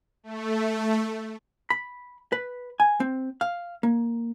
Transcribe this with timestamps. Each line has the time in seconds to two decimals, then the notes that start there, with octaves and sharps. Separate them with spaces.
0.23 A3
1.70 B5
2.32 B4
2.80 G#5
3.00 C4
3.41 F5
3.83 A#3